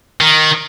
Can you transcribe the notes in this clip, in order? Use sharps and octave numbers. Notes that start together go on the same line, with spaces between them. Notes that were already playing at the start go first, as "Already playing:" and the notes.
D#3